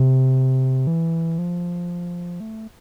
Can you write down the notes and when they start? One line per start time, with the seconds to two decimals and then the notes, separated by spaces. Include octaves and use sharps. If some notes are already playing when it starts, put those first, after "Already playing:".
Already playing: C3
0.87 E3
1.38 F3
2.40 A3